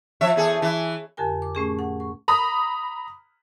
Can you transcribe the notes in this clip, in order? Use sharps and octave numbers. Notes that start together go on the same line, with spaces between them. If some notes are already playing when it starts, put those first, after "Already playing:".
F3 C#5 E5
E2 G#4 A4
E3
F2 D3 G4 A#4 G#5
D6
A2 A3 C#4 G#4
F#5
C#6
A#5 B5 D#6